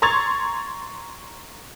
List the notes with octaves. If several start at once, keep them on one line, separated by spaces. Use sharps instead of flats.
A#5 C6 C#6 G#6 A6 F7